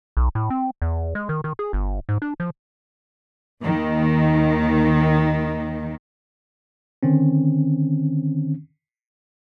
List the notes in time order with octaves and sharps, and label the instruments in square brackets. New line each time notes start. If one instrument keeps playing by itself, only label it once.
[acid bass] B1
A2
C4
E2
G#3
D#3
D#3
G#4
G1
G#2
D4
F3
[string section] D#2 D#3
[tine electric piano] D3 D#3 C4 C#4